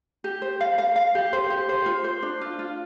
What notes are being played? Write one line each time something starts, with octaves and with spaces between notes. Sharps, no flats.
G4
C5
F5
F5
F5
G4
C5
G4
C5
F4
C5
D4
F4
F4